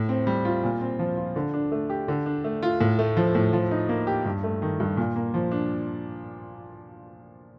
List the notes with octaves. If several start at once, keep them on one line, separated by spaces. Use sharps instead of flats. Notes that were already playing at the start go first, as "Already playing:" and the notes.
Already playing: A2
C4
G3
F4
A#2
C4
F3
F4
D3
D4
A3
G4
D3
D4
A3
F4
A2
A3
F3
A2
F3
D#4
A#3
G4
G2
A3
D#3
G2
A#2
A#3
F3
D4